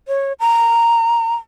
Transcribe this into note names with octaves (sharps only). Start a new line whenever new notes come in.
C#5
A#5